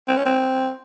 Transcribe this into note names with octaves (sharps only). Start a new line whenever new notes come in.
C4
C#4
C4